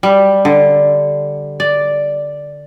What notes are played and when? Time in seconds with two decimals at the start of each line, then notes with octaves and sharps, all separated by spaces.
0.03 G3
0.45 D3
1.60 D5